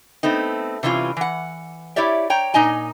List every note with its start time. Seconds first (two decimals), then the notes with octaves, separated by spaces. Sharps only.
0.23 A3 B3 C4 D#4
0.83 C3 E3 G3 C#4 F4
1.17 E3 F#5
1.96 E4 G4 C#5 D5 E5
2.30 C#5 G5 A#5
2.54 A#2 D#4 D#5 G#5 A#5